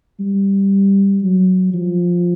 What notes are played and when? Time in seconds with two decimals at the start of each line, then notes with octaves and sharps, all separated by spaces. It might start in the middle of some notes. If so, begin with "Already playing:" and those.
0.20 G3
1.23 F#3
1.74 F3